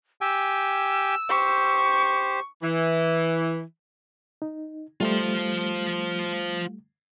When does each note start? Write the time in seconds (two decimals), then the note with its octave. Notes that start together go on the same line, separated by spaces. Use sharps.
0.21 G4 G5 G#5 E6
1.30 G4 C5 C#6
2.62 E3
4.42 D#4
5.01 G3 A3 F4 C5